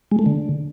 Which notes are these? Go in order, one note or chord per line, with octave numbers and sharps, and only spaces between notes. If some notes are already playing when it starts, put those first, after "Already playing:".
G#3
A3
D3